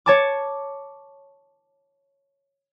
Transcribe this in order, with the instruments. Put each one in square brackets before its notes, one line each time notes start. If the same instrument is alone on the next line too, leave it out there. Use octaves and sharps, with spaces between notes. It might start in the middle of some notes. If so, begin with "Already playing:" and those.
[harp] C#5 A5 D6